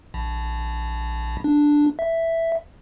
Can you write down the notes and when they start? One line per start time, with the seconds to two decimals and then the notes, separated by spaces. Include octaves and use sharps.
0.14 A#1
1.44 D4
1.99 E5